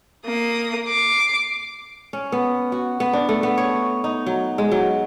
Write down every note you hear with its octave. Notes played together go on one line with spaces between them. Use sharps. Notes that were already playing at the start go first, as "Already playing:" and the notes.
A#3 D#6
D6 C7
C#4
B3
F#4
B3
D4
A3
B3
C#5
D#4
F#3
G#3
F#3